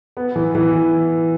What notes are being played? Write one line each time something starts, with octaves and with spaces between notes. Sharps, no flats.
B3
E3
E3